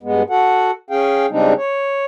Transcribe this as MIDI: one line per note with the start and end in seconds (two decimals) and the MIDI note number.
0.03 0.23 43
0.03 0.23 56
0.03 0.23 59
0.30 0.71 66
0.30 0.71 69
0.30 0.71 78
0.90 1.26 61
0.90 1.26 68
0.90 1.26 77
0.90 1.26 79
1.30 1.53 49
1.30 1.53 55
1.30 1.53 56
1.30 1.53 60
1.30 1.53 62
1.30 1.53 63
1.57 2.05 73